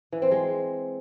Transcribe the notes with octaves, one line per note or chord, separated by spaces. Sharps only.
E3
C4
G#3